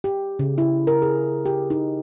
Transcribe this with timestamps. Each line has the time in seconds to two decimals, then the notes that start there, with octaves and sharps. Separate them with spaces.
0.04 G4
0.39 C#3
0.58 E4
0.87 A#4
1.02 G#4
1.46 G4
1.70 D#4